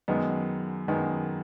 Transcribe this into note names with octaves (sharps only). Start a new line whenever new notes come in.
F#2 D#3 G#3 B3
F#2 D#3 G#3 B3